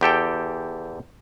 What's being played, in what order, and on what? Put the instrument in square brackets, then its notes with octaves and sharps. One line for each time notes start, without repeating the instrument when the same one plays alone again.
[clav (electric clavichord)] E2 G4 A4 G5